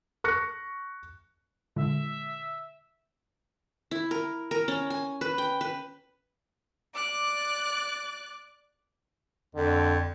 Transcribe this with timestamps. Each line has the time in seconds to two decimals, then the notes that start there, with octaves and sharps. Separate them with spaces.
0.24 C#6 F#6 A#6 C#7
1.76 A#2 D3 G#3 E5
3.91 E4
4.11 A#4
4.51 A#4
4.68 C#4
4.90 G#5
5.21 B4
5.38 G5
5.61 B4
6.94 D5 D6 F#6
9.55 F2 D3